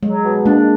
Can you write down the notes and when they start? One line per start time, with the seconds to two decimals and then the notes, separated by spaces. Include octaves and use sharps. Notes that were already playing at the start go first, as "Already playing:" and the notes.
0.03 F#3 G#3
0.24 B2
0.45 G#3 A#3 D4